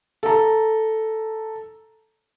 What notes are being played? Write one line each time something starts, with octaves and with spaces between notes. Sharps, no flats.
A4 A#5